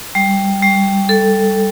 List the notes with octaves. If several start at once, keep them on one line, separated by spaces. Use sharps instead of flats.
G3
G3
A4